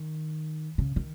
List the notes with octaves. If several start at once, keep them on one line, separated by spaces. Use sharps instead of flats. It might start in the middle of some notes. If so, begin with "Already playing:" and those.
Already playing: D#3
C#3
D#3